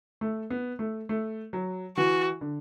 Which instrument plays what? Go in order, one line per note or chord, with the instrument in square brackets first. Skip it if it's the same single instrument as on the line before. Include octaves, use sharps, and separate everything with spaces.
[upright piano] A3
B3
A3
A3
F#3
[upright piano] E3 [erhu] F#4
[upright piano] D3